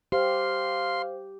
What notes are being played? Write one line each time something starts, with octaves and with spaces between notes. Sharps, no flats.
G4 C5 F5 C6